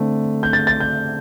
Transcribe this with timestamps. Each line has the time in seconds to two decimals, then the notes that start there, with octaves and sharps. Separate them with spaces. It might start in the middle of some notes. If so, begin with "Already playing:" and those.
Already playing: D3 A3 C4
0.43 G6
0.53 A6
0.67 A6
0.80 G6